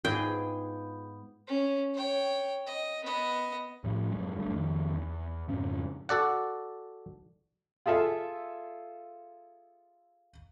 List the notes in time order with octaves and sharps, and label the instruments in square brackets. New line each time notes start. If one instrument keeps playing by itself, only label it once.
[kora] G#2 [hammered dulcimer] B3 [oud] F4 G#4 [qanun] G5
[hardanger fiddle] C#4
C#5 G5
D#5
B3 D#5
[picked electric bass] A2 F3
F#2 F#3 G#3
G1 G2 A3
F2 D#3
E2
F2 G#2 C#3
[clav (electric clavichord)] F#4 A4 D5 F#5
[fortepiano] F4 G#4 A4 E5 F5